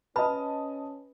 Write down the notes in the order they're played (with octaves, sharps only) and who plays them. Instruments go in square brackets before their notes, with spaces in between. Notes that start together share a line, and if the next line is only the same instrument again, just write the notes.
[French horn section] C#4 [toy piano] B4 B5 [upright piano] D#5 A5